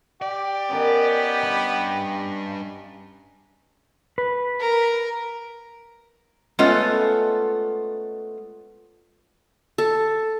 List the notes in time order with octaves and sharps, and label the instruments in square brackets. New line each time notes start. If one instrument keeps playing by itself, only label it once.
[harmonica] G4 [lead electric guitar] D5
[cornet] B3 [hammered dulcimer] C#4 A#4 D#5
[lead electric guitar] G2 B5
[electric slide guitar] B4
[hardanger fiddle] A#4
[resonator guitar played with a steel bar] G#3 A3 B3 C#4 F4 A4
[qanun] A4